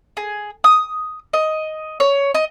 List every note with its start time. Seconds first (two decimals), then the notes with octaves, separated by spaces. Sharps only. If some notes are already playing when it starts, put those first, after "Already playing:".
0.17 G#4
0.64 D#6
1.33 D#5
2.00 C#5
2.34 D#5